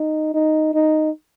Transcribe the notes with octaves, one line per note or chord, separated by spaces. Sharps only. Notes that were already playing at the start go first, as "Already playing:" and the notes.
Already playing: D#4
D#4
D#4